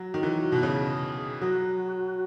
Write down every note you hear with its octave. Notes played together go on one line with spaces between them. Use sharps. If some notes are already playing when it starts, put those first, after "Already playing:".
Already playing: F#3
D#3 F#4
E3
F#4
B2
C#3 G#4
G#4
G#4
F#3 F#4